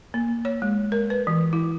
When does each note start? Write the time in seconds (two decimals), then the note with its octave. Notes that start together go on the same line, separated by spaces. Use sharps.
0.14 A#3
0.45 C#5
0.62 G#3
0.92 A#4
1.10 B4
1.27 E3
1.53 E4